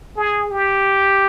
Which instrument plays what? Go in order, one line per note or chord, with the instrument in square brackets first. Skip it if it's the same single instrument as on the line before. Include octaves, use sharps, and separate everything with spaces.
[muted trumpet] G#4
G4